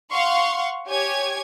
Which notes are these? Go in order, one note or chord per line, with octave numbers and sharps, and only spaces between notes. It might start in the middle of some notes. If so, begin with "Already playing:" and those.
F5 F#5 C6 C#6
G4 C#5 G#5 G#6